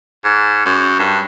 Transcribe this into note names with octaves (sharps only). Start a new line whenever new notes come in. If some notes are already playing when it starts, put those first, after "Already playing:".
G#2
F#2
G2